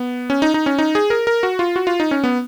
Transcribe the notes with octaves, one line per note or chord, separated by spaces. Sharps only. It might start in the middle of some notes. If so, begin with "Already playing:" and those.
Already playing: B3
C#4
D#4
D#4
C#4
D#4
G#4
A#4
A#4
F#4
F4
F#4
F4
D#4
C#4
B3